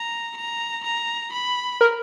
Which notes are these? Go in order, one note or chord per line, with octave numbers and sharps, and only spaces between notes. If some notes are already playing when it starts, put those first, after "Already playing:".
Already playing: A#5
A#5
A#5
B5
A#4